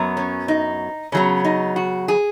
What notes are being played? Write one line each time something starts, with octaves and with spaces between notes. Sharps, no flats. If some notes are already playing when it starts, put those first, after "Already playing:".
Already playing: F#2 F#3 B3
C#4
D#4
C#3 F#3 B3 C#4
D#4
F#4
G#4